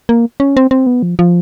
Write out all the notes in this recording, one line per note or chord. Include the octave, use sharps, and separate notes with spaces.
A#3
C#4
C4
C4
B3
F3
F3